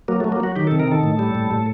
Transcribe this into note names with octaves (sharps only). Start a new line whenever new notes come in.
F#3 A#3
A3
F#3
A#3
F#3 F#4
D#3 G4
A4
C3
A#4
D#3 A4
A2
G3
A2
A2